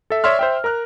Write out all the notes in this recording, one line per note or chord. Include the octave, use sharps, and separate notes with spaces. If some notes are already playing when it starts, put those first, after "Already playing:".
A4 E5
C#5 D5 E5 C6 F6
C5 E5 G5
A#4 A#5 F6 F#6